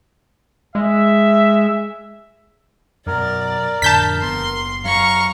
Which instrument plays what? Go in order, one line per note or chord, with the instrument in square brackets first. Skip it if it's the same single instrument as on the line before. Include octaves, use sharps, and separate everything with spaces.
[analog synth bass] G#3 [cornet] E5
[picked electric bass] F#2 B2 [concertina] A#4 [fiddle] D5
[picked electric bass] F2 A2 D3 [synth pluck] A5 G6 B6
[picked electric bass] F#1 B3 [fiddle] C6
[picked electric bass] F#2 F#3 [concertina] F5 F6 [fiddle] A#5 C#6